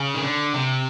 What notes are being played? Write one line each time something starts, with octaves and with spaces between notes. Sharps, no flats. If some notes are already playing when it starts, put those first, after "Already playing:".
Already playing: C#3
D#3
D3
C3